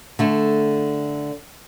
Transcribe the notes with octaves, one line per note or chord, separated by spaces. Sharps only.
D3 A3